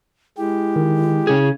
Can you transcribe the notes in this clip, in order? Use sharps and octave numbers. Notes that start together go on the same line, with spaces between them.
G#3 E4 G4
D#3
C#3 C#4 G#4 G#6